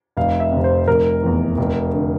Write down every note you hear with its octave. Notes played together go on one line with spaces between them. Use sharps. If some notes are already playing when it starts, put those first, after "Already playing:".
F1 F5
E5
F2 C3
C5
F1 A#4
E2 E3
F1
D3